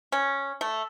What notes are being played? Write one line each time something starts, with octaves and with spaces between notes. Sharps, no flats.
C#4
A3